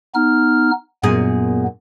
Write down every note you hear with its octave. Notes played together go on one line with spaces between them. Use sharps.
B3 D#4 F6
F#2 A#2 B3 G#4